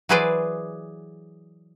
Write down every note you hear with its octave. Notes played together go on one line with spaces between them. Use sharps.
E3 F#3 G#4 B4 C5 D5